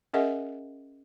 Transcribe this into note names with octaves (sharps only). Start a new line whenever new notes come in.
C#4 G#4 A#4 D#5 E5 F#5